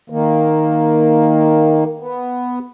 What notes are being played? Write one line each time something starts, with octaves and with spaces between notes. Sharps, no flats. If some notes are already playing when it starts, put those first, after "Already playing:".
D#3 A#3
B3